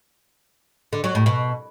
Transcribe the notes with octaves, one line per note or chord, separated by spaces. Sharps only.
D3
F#3
A2
B2